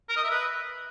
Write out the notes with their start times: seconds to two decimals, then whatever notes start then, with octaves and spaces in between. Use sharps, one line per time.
0.09 A#4
0.16 D#5
0.24 E5
0.31 B4